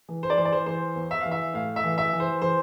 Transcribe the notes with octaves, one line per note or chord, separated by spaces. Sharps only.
E3
C5
D5
E3 C5
D5
C5
E3 C5
E2
E5
E3 F5
E5
A2 F5
E5
E3
E5
E3
C5
E3 C5